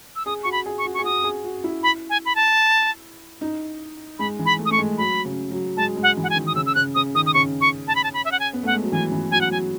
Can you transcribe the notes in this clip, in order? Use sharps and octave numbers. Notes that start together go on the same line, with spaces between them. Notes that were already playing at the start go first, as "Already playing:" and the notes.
E6
G#4 D#6
F#4 C#6
B5
G#4
C#6
F#4
G#4 C#6
F#4 D#6
G#4
F#4
E4
B5
G#5
B5
A5
D#4
G#3 B5
E3
B5
A3
D#6
A3 C#6
G#3
F#3 B5
C#3
F#3
G#3 A5
G#3
F#5
E3
F#5
G#5
D#3
D#6
C#3 E6
E6
C#3 F#6
C#3 D#6
D#3 D#6
D#6
C#3 C#6
C#6
A5
B5
A5
B5
E5
F#5
G#5
B3
A3 F#5
G#3
F#3
E3 G#5
E3
F#3 G#5
F#5
F#3 G#5